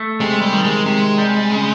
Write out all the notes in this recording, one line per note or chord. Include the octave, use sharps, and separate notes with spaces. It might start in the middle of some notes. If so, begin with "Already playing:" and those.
Already playing: A3
C3 G#3
G3
D#3
G#3
C3 G#3
G3
C#3